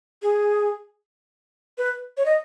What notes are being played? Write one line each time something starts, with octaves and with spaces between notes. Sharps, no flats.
G#4
B4
C#5
D#5